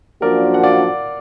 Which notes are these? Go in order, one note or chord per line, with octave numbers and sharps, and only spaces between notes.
F#2 F3 A#3 D4 F#4 A#4 D5
F#5
D5 F5